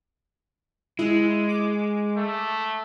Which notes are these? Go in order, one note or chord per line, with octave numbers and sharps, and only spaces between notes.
G#3 E4
D6
A3